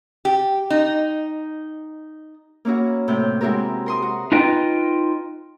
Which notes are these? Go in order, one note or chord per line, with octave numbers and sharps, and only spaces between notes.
G4
D#4
A#3 C#4 E4 F#4
A2 C3 G6
G#3 C4 E4 F#4 G4 A#4
A#4 C6 D#6
F#4
D#4 F4 B4 D#5 G5